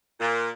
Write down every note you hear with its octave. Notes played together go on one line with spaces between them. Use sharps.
A#2